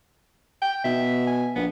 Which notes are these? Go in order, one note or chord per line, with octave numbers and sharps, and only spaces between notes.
G5
B2 E5
G#5
A#1 B3